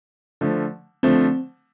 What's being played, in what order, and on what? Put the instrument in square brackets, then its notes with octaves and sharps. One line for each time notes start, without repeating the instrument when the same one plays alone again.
[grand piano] D3 F3 A3
[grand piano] D3 F3 A3 [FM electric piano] C4